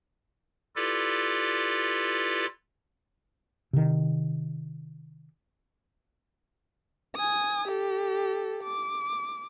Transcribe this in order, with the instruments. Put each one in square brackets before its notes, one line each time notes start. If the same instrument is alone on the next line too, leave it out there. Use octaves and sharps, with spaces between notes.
[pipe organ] E4 F4 G4 A4 B4 D5
[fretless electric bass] C3 D#3
[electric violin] G#5 D#6
G4 A4
D6